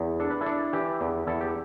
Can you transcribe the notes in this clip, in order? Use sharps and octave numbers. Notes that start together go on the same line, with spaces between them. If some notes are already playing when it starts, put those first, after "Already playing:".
Already playing: E2
D4 A4
B4
E4 A4
D4
E3 G4
E2
E2 E4 A4
G4